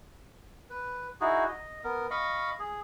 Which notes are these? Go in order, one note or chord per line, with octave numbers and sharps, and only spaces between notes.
B4
D#4 E4 F#4 G#4
D#5
B3 A#4
D#5 F5 B5 C#6
G#4